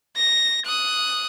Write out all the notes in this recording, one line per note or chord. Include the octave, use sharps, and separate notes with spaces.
A#6
D#6 F#6